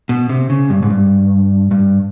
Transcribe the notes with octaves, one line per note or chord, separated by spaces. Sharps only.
B2
C3
C#3
G2
G#2
G2
G2